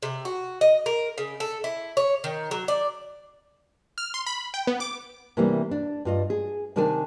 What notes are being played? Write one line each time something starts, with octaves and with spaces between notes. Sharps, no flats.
C3
F#4
D#5
A#4
C#3
A4
E4
C#5
D#3
F#3
D5
F6
C6
B5
G5
B3
D6
C3 E3 G3 A#3 B3 D4
D4
G2 F4 D#5
G#4
C3 D#3 D4 A#4 G#5 A5